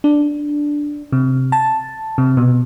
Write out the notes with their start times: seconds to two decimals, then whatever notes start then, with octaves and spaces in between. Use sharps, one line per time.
0.04 D4
1.12 C3
1.52 A5
2.18 C3
2.37 B2